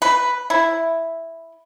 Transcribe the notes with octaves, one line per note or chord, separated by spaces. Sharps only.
B4
E4